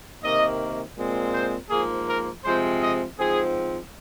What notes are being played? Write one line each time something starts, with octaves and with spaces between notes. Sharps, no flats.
C3 D#3 A#3 D#5
A#2 G#3 C4
C5
G#2 F3 A#3 G#4
A#4
C3 F3 G#3 C4 C5
D#5
G#2 F3 C4 G#4